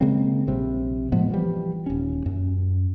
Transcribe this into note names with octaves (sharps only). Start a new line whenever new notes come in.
C#3 G#3 A#3 C4
A#1 C3 G3
A2 F3 G#3 B3
E3 F3 G3
D#1 C#4
F#2